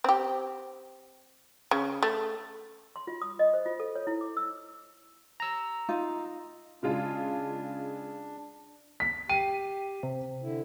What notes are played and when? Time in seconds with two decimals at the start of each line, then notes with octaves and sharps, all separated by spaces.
0.04 C4 G4
1.71 C#3
2.03 A3
2.96 C6
3.07 F4
3.22 D#6
3.39 D#5
3.54 C5
3.66 F4
3.80 A4
3.96 C#5
4.07 E4
4.21 D6
4.37 E6
5.40 A#5 E6
5.89 D#4 F4
6.83 C#3 G#3 D4 F4
9.00 B6
9.29 G4 G5 D#7
10.03 C3
10.43 D3 E4